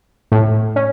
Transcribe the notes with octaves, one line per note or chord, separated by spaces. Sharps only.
A2
C#4